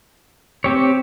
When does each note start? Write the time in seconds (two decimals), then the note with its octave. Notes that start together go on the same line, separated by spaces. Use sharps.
0.64 C4 G4 C#5